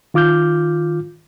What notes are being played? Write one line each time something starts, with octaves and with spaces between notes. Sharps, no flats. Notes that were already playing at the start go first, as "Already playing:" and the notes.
D#3 F4 D6 F6 G6